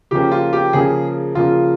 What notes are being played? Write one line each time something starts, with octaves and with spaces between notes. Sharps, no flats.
C#3 F3 A#3 C#4 G4
F4
G4
C#3 F3 A#3 C#4 G#4
C#3 F3 A#3 C#4 F4